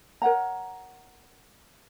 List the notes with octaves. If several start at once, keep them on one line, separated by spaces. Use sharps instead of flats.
A#4 C#5 F#5 A#5